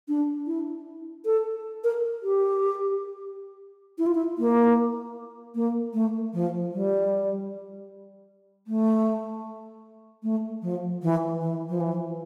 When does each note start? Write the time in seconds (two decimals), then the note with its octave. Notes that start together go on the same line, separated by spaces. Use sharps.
0.08 D4
0.47 E4
1.26 A4
1.84 A#4
2.23 G4
3.99 E4
4.06 F4
4.15 E4
4.38 A#3
5.55 A#3
5.94 A3
6.34 F3
6.73 G3
8.67 A3
10.23 A3
10.62 F3
11.02 E3
11.41 E3
11.69 F3
11.81 E3